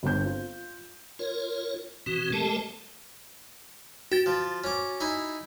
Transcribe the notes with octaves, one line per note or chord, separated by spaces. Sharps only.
G1 C4 C5 G6
F4
F4 A#4 C#5
B2 E3 C4 F#4
G#3 A3 G4 A4 A#4 A5
F#4 G5 A6
F3
C#4 D6
D#4 E4 G#5